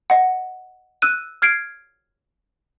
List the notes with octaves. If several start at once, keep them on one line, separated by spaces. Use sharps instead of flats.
D#5 F#5
E6 F#6 D#7
F6 G#6 C7 D7